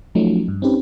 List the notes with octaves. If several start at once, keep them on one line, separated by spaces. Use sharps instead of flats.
F3 F#3 A3 C#4 D#4
G2
C4 C#4 D#4 G4 B4